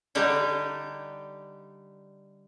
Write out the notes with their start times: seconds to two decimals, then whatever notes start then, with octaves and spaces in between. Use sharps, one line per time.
0.15 D3 G3 D#4 G4